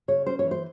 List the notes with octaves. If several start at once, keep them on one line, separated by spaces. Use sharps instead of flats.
C#3 C#5
C#4 C5
E3 C#5
C5